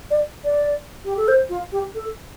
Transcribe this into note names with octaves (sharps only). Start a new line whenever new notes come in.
D5
D5
G4
A4
C5
F4
G4
A4